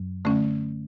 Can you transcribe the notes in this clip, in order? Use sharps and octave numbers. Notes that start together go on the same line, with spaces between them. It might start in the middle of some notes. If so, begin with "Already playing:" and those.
Already playing: F#2
D3 A3 C#4